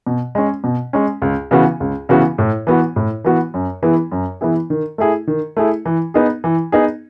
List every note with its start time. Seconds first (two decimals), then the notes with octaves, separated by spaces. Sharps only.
0.07 B2
0.35 G#3 C#4
0.64 B2
0.93 G#3 C#4
1.22 C#2
1.51 C#3 E3 B3 F#4
1.80 C#2
2.09 C#3 E3 B3 F#4
2.38 A2
2.67 E3 B3 F#4
2.96 A2
3.25 E3 B3 F#4
3.54 F#2
3.83 E3 B3 E4 G#4
4.12 F#2
4.41 E3 B3 E4 G#4
4.70 D#3
4.98 A3 E4 G#4
5.27 D#3
5.57 A3 E4 G#4
5.86 E3
6.14 B3 D#4 G#4
6.44 E3
6.72 B3 D#4 G#4